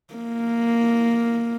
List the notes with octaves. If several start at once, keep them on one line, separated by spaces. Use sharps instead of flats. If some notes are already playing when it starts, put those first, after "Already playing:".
A#3